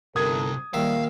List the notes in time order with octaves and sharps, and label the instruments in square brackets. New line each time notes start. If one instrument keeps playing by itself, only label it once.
[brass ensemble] G1 A4 A#4 [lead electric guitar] C3 G3 [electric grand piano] D#6 G#6
[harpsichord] A#1 D#3 E5 [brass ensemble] G3 [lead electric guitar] F5